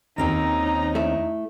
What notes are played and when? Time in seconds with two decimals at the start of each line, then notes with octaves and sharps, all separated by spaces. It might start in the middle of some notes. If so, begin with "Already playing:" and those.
0.18 D#2 C4 C#4 D#4 A#5
0.95 A3 E4